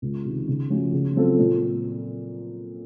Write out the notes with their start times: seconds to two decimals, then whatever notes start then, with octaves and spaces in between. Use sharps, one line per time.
0.02 C#2
0.25 C3 D#3
0.48 C#3
0.70 F3 A3 C#4 F#4
0.93 C#3
1.16 F#3 C4 F4 A4
1.39 A#2